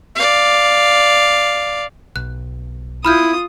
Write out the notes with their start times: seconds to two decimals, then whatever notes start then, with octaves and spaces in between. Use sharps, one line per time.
0.15 D5 F5
2.16 B1 F#6
3.05 E4 F4 B5 D#6 F6 G6